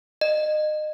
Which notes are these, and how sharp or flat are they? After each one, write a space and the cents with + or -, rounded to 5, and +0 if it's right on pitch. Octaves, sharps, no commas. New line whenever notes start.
D#5 -30